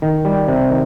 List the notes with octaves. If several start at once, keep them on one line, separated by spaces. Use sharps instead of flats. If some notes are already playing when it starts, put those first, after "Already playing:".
D#3
G3
C3
D#3